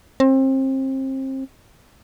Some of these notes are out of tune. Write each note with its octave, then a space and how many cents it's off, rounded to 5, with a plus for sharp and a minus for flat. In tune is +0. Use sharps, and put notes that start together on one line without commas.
C4 +30